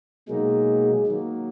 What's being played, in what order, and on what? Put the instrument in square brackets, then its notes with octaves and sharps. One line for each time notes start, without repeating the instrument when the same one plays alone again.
[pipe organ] B2 F#3 A#3 D#4 [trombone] G#3
[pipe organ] D#3 F#3 A#3